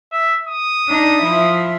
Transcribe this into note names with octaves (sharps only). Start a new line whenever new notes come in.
E5
D#6
D4 D#4
F3 E4